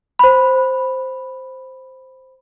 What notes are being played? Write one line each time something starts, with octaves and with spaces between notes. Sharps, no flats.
C5 B5